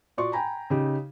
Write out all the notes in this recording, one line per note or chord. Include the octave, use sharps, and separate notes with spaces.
A#2 F#4 D5 C6 C#6
G5 G#5 A#5 B5
C#3 D#4 G4